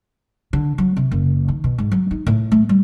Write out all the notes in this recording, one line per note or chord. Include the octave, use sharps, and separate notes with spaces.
D3
F#3
C3
F#1
D#3
B2
G#2
F#3
D#4
A2
A3
G3